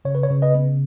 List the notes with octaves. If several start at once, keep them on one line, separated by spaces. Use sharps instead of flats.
C#3 C#5
B4
C#5
C#3
B4 D#5
B3